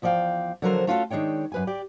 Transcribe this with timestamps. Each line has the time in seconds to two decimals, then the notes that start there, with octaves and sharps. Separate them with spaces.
0.02 E2 F3 D5 D#5 F5 G5
0.62 D3 F3 F#3 A4 A#4 C5
0.87 A3 C#4 F4 F#4 G#4 A4
1.10 D#3 G#3 D4 C#5 G5
1.52 F#2 B4 G#5
1.67 G4 D5